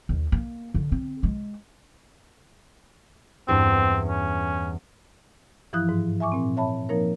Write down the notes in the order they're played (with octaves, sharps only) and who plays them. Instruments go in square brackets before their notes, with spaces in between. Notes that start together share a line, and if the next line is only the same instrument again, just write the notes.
[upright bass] D#2
A#3
D3
C4
G#3
[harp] E2 G2 [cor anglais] C4
[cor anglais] C#4
[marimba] G2 E3 F3 E4 D#6 F#6
G#2
E5 G#5 C#6 D6
A#2 C4
C#5 E5 A5 B5
F3 A#3 D#4 A#4 C#5